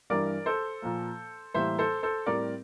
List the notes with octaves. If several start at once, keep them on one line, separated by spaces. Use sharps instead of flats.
G2 E3 G3 A#4 D5
A4 C5
A#2 F3 A#3
A2 E3 G3 A#3 C5 E5
A4 C5
A4 C5
A2 G3 C4 A#4 D5